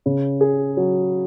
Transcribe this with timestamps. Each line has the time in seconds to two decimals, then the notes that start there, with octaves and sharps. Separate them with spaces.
0.06 C#3
0.41 G#4
0.77 F#3